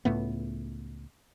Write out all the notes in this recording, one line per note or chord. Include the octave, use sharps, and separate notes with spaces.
C#2 A2 A3 B3